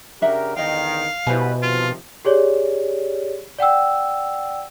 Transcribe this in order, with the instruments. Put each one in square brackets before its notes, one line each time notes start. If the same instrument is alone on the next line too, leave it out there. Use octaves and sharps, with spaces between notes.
[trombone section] C#3 G4 A#4 [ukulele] D4 E5 F#5
[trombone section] E2 D3 D#3 [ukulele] D#5 G5 [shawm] F5
[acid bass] B2 [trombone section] G3 B4 [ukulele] E4 C5 G#5
[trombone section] C3 D#3 F3 [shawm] F4
[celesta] G4 G#4 C#5 D5
D5 F#5 G5 E6